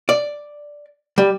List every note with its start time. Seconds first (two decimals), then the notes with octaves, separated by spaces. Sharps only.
0.09 D5
1.18 G3